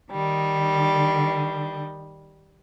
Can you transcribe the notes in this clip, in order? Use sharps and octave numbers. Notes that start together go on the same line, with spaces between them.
D#3 G3